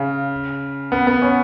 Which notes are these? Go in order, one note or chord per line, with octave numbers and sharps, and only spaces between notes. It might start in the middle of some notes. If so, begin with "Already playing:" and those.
Already playing: C#3
B3
B3
C#4